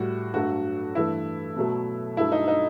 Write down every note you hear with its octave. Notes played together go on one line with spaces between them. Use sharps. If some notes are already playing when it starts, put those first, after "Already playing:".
Already playing: A2 G3 F#4
G2 F#3 A3 F#4
G2 E3 A3 E4
B2 F#3 A3
G2 F#3 A3 E4
D#4
D#4